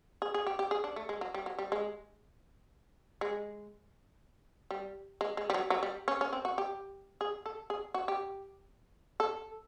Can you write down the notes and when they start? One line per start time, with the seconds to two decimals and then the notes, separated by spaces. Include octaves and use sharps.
0.22 G#4
0.34 G#4
0.47 G4
0.59 G4
0.71 G#4
0.84 D4
0.96 A3
1.09 G#3
1.21 F#3
1.34 G3
1.46 F#3
1.59 G3
1.72 G#3
3.21 G#3
4.71 G3
5.21 G#3
5.37 G#3
5.50 G3
5.54 F#3
5.70 F#3
5.83 G3
6.08 C#4
6.21 C#4
6.33 C4
6.45 F#4
6.58 G4
7.21 G#4
7.46 A4
7.70 G#4
7.94 F#4
8.08 G4
9.20 A4